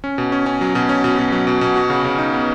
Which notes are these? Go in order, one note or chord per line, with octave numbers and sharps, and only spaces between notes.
C#4
B2
C#4
C#4
F#3
B2
C#4
B2
B2
F#3
B2
B2
F#4
C#3
C#3
D#4
B3